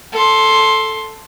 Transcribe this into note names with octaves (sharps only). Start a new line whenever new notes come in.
A4 C6